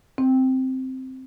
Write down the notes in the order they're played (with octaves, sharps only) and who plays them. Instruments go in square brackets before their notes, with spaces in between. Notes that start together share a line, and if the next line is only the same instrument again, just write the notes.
[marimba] C4